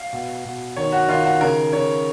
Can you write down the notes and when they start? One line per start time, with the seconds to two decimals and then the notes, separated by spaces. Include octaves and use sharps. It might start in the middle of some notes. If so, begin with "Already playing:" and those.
Already playing: F5
0.13 B2
0.45 B2
0.77 D#3 C#5
0.93 F#4
1.08 D#3 F4
1.24 F#4
1.41 C#3 A#4
1.73 C#3 C#5